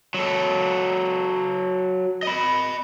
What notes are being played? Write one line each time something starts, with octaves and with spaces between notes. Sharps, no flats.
F#3 A4
D#5 B5